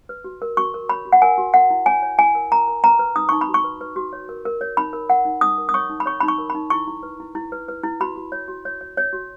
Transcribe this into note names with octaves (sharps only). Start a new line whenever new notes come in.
B4
F#4
A#4
F#4 C#6
A#4
C#5 B5
F#4
F#5
A#4 G#5
F#4
A#4 F#5
E4
C#5 G#5
C#5
E4 G#5
A#4
A#4 A#5
A#4
B4 A#5
B4
D#4 D#6
D#4 C#6
B5
F#4
C#6
B4
B4
F#4
C#5
A#4
A#4
C#5
D#4 B5
A#4
A#4 F#5
D#4
D#4 D#6
A#4
D#6
C#5 C#6
D#4
B5
C#5 C#6
D#4 B5
C#6
A#4
B5
D#4
E4 C#6
E4
B4
E4
E4
B4
B4
E4
F#4 B5
F#4
C#5
F#4
C#5
C#5
C#5
F#4